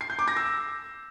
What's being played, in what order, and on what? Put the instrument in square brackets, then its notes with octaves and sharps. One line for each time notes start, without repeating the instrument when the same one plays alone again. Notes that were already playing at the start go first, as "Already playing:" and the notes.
[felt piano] C7
G6
D6
A#6
E6